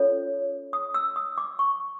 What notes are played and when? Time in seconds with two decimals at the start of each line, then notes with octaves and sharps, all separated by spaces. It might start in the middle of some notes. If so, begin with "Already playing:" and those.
Already playing: C#4 F4 A4 C#5
0.73 D#6
0.94 E6
1.16 D#6
1.38 D6
1.59 C#6